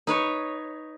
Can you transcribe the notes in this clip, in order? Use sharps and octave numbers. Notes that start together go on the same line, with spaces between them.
D#4 B4 C#5